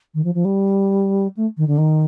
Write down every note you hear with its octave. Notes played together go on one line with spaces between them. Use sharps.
D#3
F3
F3
G3
A3
D#3
D3
D#3